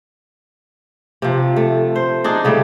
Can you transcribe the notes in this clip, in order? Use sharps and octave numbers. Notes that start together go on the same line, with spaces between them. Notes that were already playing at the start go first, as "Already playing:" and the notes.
C3 F3
A3
C5
D4 D#4 G#4
C#3 G3 A3